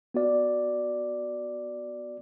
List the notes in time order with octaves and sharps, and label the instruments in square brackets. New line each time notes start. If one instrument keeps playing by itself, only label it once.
[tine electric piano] B3 F#4 D5